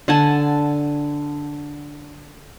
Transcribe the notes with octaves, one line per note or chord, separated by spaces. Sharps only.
D3 F#5 G#5 A5